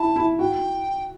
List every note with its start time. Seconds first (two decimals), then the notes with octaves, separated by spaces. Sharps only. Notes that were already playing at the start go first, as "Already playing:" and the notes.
Already playing: E4 A5
0.16 E4
0.39 F#4 G5